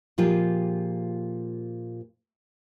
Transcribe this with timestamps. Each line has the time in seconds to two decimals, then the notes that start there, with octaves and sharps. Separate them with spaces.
0.18 A#2 F3 F4 G4 G#4